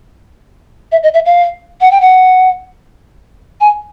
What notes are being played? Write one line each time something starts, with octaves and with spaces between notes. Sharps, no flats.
E5
D#5
E5
F5
F#5
G5
F#5
G#5